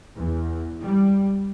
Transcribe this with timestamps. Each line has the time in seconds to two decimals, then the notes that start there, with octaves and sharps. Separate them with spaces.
0.16 E2
0.83 G3